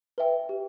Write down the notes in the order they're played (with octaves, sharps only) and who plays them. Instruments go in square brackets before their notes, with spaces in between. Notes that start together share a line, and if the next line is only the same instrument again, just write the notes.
[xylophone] B4 E5 G5
G4